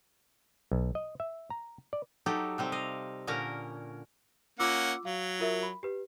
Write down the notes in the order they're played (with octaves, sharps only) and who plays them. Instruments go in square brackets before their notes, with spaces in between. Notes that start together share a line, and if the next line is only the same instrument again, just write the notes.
[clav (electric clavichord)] B1
D#5
E5
A#5
D5
[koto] F#3 D#4 G4 A4
C3 G3 C4
D#5 F5
A#2 D3 C#4 A#4 A#5
[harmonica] A#3 C#4 F#5 [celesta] F4 D6 E6
[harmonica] F#3 [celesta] F5
[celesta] F4 A#4 E5
B5
G4 B4